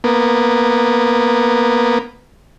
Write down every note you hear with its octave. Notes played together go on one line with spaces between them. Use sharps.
A#3 B3